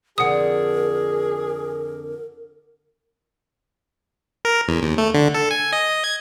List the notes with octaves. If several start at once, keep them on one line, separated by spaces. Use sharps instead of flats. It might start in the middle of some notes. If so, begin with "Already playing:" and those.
F2 D3 G#4 A#4 F#5 D#6
A#4
E2
D#2
A3
D3
A4
G#5
D#5
G#6